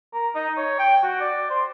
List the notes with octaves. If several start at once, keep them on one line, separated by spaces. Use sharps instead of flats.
A#4
D#4
C#5
G5
F#4
D5
C5